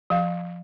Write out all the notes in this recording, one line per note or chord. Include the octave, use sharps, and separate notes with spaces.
F3 F5